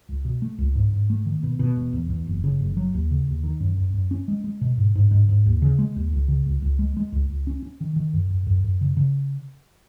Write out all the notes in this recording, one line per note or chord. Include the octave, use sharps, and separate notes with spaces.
C#2
B2
A3
C#2
G#2
G#2
A3
D#3
B2
B2
E1
E2
E2
F#1
C#3
F#1
F#3
D#2
C#3
D#2
D#3
F#2
F#2
F#2
C#4
G#3
G#3
B2
G#2
G#2
G#2
G#2
D#2
C#3
G#3
D#2
C#2
C#3
C#2
C#2
G#3
G#3
C#2
C#2
C#4
C#4
D#3
D#3
F#2
F#2
F#2
F#2
C#3
C#3